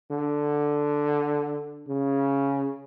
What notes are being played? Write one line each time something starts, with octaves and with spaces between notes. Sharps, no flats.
D3
C#3